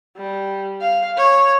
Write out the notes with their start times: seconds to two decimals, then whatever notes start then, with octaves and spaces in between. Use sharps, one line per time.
0.17 G3
0.82 F5
1.17 C#5